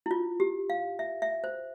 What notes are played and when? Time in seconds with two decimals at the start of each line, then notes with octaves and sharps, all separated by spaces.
0.06 E4
0.11 F4
0.40 G4
0.70 F5
0.99 E5
1.22 E5
1.44 C5